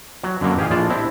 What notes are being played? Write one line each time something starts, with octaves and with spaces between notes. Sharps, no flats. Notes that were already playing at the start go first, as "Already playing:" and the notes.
F#3
F#2 D3 F3 F#3 A#3 E4
A1 G4 G#4 F5
A#1 A2 G#3 F4 D5 A5
C4 D4 E4 G4